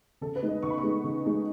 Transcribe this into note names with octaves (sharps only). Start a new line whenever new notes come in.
C#3 A4
B4
G#3 D#4
D#5
C#3 C#6
B5
C#6
G#3 D#4
C#3
G#3 D#4